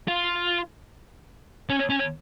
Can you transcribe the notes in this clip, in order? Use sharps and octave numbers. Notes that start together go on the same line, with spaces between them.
F4
C#4
C#4